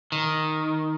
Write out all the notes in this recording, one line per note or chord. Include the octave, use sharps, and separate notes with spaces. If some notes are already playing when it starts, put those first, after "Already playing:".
D#3